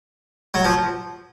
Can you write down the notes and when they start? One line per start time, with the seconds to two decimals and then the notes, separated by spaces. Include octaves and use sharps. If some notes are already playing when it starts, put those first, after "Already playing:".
0.54 F#3
0.65 F3